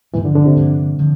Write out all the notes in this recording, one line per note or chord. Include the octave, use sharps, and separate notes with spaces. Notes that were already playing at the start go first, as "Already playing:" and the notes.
G2 E3 F3 A3 D4
D3
D3
C3
G2 F3 A#3 D4
D3 F3